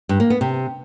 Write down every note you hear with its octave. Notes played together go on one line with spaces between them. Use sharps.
G2
A#3
B3
C3